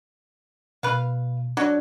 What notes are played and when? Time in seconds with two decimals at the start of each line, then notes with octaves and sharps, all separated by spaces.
0.83 B2 B4 F5
1.57 F#3 D4 D5